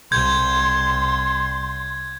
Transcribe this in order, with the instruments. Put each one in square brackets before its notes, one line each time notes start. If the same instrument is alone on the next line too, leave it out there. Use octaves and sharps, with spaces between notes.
[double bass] C2 [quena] C6 [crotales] G6 G#6